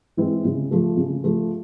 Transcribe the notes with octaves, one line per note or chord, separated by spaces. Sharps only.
E3 G#3 C4 E4
C#3
F3 A3
C#3
F3 A3